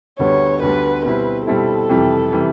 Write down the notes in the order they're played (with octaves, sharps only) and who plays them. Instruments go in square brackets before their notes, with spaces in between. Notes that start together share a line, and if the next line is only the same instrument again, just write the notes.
[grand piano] D2 D3 G3 B3 [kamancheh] C#5
[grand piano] D2 D3 G3 B3 [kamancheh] B4
[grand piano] B2 G3 C4 E4 [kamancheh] B4
[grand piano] B2 G3 C4 E4 [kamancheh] A4
[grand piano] F2 C3 E3 G3
C3 E3 G3